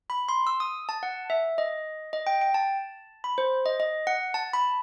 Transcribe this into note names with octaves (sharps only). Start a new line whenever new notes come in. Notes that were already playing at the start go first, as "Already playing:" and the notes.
B5
C6
E6
D#6
A5
F#5
E5
D#5
D#5
G5
G5
A5
B5
C5
D#5
D#5
F#5
A5
B5